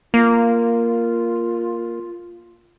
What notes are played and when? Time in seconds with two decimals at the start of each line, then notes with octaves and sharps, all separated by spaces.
0.14 A#3 F4